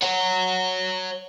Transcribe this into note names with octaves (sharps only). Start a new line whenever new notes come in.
C#5 F#5